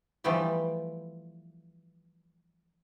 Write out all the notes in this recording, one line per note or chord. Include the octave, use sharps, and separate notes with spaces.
E3 F3 G3 A3 B3 G4